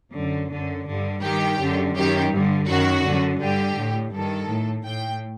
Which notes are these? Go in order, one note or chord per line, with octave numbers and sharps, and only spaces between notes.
F#2 D3
D3
F#2
G2 D3
G2 D#3 G4
F#2 D3
F#2 D#3 G4
G2 D3
F#2 D#3 F#4
F#2 D3
G2 D3 G4
A2
G2 D#3 A4
A2
A2 G5